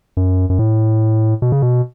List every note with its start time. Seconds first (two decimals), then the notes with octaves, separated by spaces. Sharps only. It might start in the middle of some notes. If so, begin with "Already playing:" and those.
0.17 F#2
0.50 F#2
0.59 A2
1.42 B2
1.52 C#3
1.62 B2